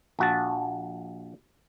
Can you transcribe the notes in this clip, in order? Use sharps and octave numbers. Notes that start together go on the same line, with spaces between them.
A#1 F#4 A5